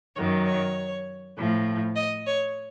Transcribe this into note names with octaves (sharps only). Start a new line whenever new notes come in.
F#2 D#3 F#3 C#5
C#5
A2 F3
D#5
C#5